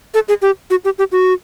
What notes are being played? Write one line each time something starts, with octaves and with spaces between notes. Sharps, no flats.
A4
G#4
G4
F#4
G4
G4
F#4